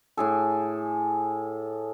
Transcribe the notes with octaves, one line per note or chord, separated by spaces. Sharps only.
A2 G#4 A4